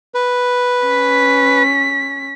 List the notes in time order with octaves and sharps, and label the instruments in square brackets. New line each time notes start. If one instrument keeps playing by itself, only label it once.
[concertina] B4
[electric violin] C#4 B6